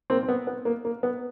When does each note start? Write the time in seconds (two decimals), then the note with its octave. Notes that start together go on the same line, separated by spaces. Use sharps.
0.10 A#3 C4
0.23 C4
0.28 B3
0.47 B3
0.65 A#3
0.85 A#3
1.03 B3